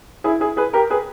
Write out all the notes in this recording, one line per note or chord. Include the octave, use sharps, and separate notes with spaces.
E4 G#4
E4 G#4
G#4 B4
G4 A#4
G#4 B4